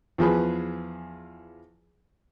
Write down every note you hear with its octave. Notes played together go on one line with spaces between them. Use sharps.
E2 F3 G#4 B4